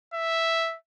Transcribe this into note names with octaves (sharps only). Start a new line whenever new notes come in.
E5